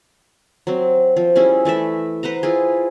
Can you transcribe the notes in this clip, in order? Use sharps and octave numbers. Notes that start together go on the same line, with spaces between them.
F#3 C4
F3
G3 C#4 E4 G#4
E3 A3 D5 E5
B4 C5 F#5 A#5
E4 F4 G#4